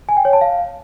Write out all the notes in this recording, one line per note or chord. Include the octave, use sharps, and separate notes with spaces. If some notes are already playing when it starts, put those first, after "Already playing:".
G#5
G5
C#5
A5
F5